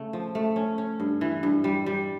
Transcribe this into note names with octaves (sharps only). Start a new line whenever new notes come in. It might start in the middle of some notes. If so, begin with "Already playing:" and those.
Already playing: C#3 A3
F3
A3
C#4
C#4
G2
E3
G2
G3
G3